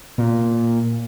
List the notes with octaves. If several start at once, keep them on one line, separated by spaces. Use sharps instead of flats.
A#2